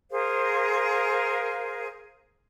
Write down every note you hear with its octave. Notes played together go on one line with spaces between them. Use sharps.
G#4 A#4 C5 F5